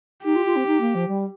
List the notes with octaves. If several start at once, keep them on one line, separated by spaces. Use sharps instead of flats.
D#4 G4
F4
F4
C4
D#4
A#3
F3
G3